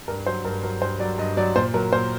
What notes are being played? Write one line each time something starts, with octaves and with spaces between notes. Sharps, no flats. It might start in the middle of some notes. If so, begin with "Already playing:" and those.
G2 A#4
F#3 C5
G2 A#4
F#3 A#4
G2 C5
F#3 D5
G2 D#5
F#3 D5
A#2 C5
F#3 A#4
A#2 C5